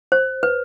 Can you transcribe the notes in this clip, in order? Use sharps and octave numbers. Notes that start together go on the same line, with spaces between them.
C5
B4